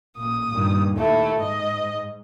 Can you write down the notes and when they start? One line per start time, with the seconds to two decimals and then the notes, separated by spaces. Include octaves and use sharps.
0.18 A1 A#2 D#6
0.51 G2 A#2 D#3
0.97 D#2 A3 E4
1.39 G#2 D#5